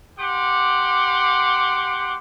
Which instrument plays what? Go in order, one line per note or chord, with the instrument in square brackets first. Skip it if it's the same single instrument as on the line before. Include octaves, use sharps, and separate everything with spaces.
[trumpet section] G4 F#5 C6 D6